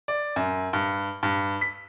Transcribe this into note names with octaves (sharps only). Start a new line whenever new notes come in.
D5
F#2
G2
G2
B6